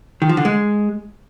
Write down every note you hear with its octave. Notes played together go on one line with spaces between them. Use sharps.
D#3
F3
D3
G#3